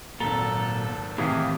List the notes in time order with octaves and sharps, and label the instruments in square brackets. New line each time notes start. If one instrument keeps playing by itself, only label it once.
[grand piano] G#1 G7 [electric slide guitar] A#2 F#3 A#5 [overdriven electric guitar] A4
[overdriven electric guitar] D#2 D#3 [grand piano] A2 C3 E3 [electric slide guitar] G4 G#4 F5